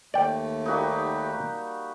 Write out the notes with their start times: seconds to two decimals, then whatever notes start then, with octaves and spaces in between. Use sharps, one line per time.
0.14 D#2 A3 D5 G5
0.66 G3 A#3 D#4 F#4 G4 D#6